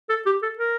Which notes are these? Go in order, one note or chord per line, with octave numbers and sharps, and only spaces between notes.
A4
G4
A4
A#4